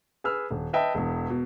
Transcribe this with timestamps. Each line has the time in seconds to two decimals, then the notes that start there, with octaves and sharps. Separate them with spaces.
0.24 G#4 B4 E6 F6
0.51 D#1
0.73 B4 D#5 E5 G5 A5
0.95 E1 E2
1.30 B2